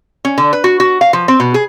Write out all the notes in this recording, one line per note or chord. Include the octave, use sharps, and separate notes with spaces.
C#4
D3
B4
F#4
F#4
F5
F3
C4
B2
G#4